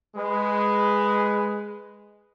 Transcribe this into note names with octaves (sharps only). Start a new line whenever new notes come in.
G#3 B4